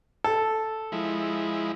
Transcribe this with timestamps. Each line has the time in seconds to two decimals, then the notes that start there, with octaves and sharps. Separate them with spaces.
0.24 A4
0.92 F3 G#3 E4